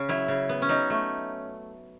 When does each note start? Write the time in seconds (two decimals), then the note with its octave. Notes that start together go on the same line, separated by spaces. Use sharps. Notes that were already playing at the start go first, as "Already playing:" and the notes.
Already playing: C#3 C#4
0.09 F#3 E4
0.28 C#3
0.49 B3
0.62 C#4
0.69 F#3 D#4
0.90 A3